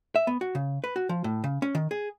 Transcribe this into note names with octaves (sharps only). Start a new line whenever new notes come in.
E5
B3
F#4
C#3
B4
F#4
F3
A2
C#3
C#4
D#3
G#4